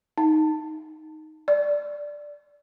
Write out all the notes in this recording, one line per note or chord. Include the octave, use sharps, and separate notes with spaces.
D#4
D5